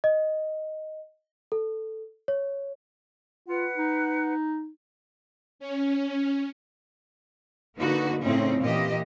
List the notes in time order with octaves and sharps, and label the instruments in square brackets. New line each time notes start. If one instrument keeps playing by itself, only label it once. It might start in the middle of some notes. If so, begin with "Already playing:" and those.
[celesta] D#5
A4
C#5
[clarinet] F4 [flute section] B4 F#5
[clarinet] D#4
[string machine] C#4
[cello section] D3 A#3 D#4 F#4 B4
A2 C#3 C4 C#4 D#4
A#2 E3 A#3 G4 D#5